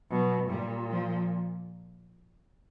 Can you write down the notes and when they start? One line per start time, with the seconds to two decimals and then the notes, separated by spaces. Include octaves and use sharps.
0.11 B2 F#3
0.50 A#2 G3
0.91 F3